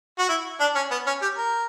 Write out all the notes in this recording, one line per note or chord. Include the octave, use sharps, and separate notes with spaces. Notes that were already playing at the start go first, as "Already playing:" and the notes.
F#4
E4
D4
C#4
B3
C#4
G4
A#4